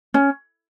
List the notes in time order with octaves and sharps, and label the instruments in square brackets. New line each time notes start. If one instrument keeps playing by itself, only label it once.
[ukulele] C#4